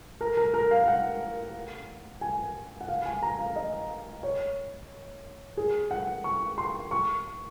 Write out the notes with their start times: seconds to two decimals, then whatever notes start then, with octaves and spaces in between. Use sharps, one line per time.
0.21 A#4
0.37 A#4
0.54 A#4
0.71 F5
0.83 F5
0.88 F#5
2.21 G#5
2.81 F#5
2.88 F5
3.05 G#5
3.23 A#5
3.39 F5
3.56 D#5
4.23 C#5
5.57 G#4
5.91 F#5
6.24 C#6
6.58 C6
6.91 C#6